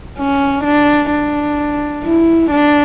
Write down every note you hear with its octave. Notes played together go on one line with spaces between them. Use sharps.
C#4
D4
D4
E4
D4